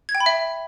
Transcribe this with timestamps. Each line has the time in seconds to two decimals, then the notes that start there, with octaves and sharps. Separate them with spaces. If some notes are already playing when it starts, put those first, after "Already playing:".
0.09 G#6
0.15 G5
0.20 B5
0.26 E5